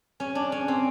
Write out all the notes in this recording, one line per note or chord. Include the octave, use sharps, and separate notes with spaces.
C#4
D4
C#4
C4